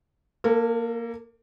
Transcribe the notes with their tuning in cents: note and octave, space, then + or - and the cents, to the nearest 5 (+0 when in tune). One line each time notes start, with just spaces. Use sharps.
A#3 +0 A4 +40